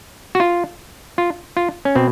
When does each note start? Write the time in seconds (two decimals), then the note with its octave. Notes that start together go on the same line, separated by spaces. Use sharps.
0.35 F#4
0.40 F4
1.18 F4
1.57 F4
1.85 C#4
1.95 B2 C4